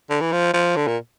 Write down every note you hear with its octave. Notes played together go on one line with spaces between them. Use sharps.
D3
E3
F3
F3
D3
A#2